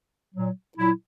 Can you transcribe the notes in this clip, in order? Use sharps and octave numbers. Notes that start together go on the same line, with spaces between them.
A#2 F#3
A#2 F#3 E4